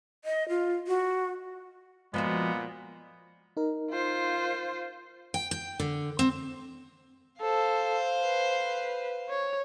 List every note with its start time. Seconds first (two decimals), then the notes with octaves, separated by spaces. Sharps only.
0.25 D#5
0.49 F4
0.87 F#4
2.14 A#2 F3 G#3 B3 F4 F#4
3.57 D#4 A#4
3.90 F4 C5
5.34 G5
5.51 G5
5.80 D3
6.19 C4
7.41 A4 C5 F5
8.22 B4
9.29 C#5